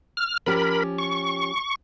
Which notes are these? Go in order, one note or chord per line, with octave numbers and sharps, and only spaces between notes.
F6
F3 C#4 G4 A#4 B5
C#6